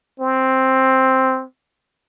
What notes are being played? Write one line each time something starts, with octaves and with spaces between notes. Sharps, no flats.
C4